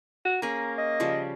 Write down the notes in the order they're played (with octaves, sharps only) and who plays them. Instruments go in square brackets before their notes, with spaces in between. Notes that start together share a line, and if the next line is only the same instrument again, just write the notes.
[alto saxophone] F#4
[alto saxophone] A#3 [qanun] C#4 G#4 [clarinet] A#5
[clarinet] D#5
[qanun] C#3 F3 G3